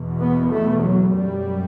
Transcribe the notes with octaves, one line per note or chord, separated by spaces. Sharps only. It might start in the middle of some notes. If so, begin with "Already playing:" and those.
Already playing: E2 B2
B3
A3
F#3
F#2 G3